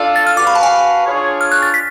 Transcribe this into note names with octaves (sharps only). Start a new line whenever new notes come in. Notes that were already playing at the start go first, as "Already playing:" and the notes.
Already playing: D4 F4 A4 D5 F5
A6
F6
F#4 B4 F5 D6
B5
A5
G#5
D4 F4 G#4 C#5
F6
F#6
A6
B6